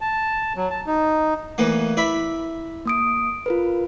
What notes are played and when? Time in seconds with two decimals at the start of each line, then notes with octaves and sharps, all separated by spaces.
0.01 A5
0.56 F#3
0.70 A5
0.86 D#4
1.58 E2 E3 A3 A#3
1.97 E4 D5 E5 B5
2.85 A#3 D#6 D7
3.46 F4 A#4 B4